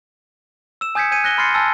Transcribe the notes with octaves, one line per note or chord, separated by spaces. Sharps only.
E6 E7
G#5 D#6 G6 G#6 B6 C#7
G#5 G6 G#6 C#7 D#7
F#6 A#6 G7
B5 C6 F6 A6 C7 C#7
G#5 A5 E6 F6 A6